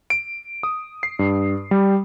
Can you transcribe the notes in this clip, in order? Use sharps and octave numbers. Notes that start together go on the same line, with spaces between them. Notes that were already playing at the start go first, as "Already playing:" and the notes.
D7
D#6
C7
G2
G3